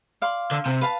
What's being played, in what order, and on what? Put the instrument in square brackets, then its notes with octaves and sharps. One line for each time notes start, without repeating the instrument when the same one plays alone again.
[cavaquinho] D5 F5 C6
[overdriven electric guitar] D3
C3
[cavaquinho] B4 F5 A5